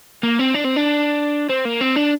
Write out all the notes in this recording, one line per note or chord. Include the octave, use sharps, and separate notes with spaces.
A#3
C4
D4
C4
D4
C4
A#3
C4
D4